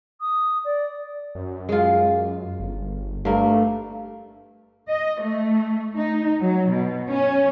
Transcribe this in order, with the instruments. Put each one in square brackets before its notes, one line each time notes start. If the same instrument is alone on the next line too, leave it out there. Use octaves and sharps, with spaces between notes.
[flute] D#6
D5
[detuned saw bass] F#2
[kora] G#3 F4
[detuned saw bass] G1
[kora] G2 A#3 [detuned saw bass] A3
[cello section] D#5
A3
D#4
F#3
B2
C#4